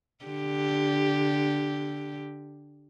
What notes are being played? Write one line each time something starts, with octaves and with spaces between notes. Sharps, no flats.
D3 G4